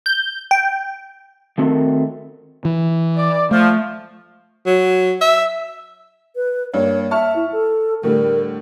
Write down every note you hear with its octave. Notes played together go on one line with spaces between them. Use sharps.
G6
G5
D#3 A3 C4 F#4 A#4
E3
D5
F3 A3
F#3
E5
B4
G2 A#3 C#5
E5 A5 C#6 F6
E4
A4
A2 D3 G3 A#4